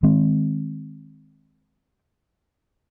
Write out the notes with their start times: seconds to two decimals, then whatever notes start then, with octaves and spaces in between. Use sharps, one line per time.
0.03 D#3 G#3 C4